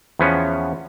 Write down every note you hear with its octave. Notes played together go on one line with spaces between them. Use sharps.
E2 F3 B3 C#4